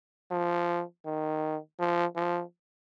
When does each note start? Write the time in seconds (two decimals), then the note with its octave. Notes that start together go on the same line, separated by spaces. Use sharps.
0.31 F3
1.06 D#3
1.79 F3
2.16 F3